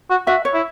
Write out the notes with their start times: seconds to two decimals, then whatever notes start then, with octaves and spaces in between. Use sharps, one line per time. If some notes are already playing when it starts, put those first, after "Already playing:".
0.10 F#4
0.27 F#4 E5
0.45 C#5
0.54 E4